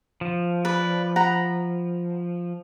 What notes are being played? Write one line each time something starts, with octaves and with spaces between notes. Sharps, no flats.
F3
B4 D5
F#5 A#5 B5